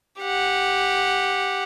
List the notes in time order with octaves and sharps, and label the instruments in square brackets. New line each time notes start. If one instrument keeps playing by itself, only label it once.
[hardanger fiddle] G4 F#5